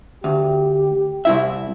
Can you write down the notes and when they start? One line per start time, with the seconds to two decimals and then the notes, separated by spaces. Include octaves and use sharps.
0.24 D2 G4
1.25 C2 E4 E5